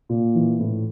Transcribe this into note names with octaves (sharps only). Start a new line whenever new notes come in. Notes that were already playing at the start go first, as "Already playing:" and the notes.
A#2
E3
A2